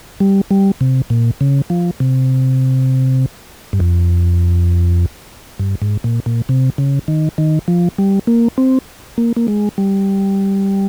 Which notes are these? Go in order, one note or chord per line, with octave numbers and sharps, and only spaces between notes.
G3
G3
C3
A#2
C#3
F3
C3
G2
F2
G2
G#2
A#2
A#2
C3
C#3
D#3
D#3
F3
G3
A#3
C4
A#3
A#3
G#3
G3